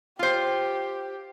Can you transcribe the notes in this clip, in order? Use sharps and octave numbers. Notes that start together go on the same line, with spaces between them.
F4 G4 C5